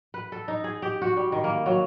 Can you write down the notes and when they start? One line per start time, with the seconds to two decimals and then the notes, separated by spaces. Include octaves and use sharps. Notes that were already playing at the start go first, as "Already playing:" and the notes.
0.14 B4
0.32 A4
0.48 D#4
0.64 G#4
0.82 G4
1.02 F#4
1.17 G3
1.32 D#3
1.44 A#3
1.66 F#3